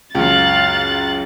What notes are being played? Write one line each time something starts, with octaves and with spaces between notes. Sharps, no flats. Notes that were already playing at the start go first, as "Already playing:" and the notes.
C#2 F#2 F5 F#6 A6